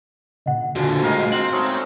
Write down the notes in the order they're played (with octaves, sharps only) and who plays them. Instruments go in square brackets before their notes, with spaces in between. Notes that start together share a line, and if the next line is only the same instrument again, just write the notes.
[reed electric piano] A#2 C#3 [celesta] D#5 F#5
[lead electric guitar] A#2 D3 [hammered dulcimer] F3 [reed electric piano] F#4 G#5
[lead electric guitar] A2 G#3 [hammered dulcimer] A#3 A#4 F5
[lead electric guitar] C4 [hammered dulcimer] F#5 [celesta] F#7
[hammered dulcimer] A3 C#4 D#4